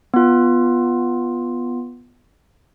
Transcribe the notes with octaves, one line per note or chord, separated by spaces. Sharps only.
B3 F4